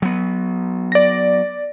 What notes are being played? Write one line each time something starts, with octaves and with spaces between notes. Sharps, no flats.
F#3 B3
D5 A#6